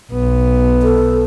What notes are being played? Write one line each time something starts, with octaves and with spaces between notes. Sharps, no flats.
B1 B3
A4